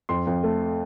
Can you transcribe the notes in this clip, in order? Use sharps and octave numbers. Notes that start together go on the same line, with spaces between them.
F2 C6
F2
A3